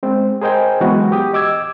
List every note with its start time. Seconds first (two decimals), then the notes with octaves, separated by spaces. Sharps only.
0.03 G#3 C4
0.41 G#4 A#4 C5 D#5 G5 G#5
0.81 E3 F#3 G#3 B3 F#4
1.12 G4 D#6
1.33 D#5 D6 E6 G#6